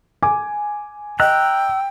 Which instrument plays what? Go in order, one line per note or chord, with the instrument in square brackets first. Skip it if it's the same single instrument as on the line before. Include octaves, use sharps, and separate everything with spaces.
[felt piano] G#5 D6
[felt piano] D#5 [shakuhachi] G5 [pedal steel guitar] A#5 E6 F#6